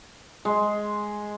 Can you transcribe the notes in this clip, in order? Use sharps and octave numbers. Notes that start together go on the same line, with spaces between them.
G#3